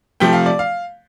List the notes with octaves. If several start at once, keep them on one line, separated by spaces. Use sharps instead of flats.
C3 F3 A3 G5
F5
D5
F5